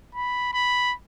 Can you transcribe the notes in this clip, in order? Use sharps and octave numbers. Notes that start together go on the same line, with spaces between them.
B5
B5